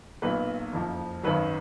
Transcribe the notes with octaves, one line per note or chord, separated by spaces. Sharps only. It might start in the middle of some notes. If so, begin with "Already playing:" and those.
B1 A#2 F#3 B4
F#1 F2 F3
G#1 F#2 D#3 F#3 B4